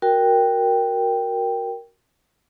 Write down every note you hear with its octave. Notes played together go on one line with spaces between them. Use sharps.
F#4 A#4 G5